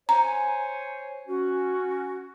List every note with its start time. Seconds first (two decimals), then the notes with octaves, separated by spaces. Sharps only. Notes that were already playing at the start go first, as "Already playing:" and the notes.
0.09 C5 C#5 G#5 A#5
1.27 C#4 F#4